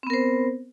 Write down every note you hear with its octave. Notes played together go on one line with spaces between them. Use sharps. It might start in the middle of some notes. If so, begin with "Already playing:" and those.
B3 C4 A#4 C5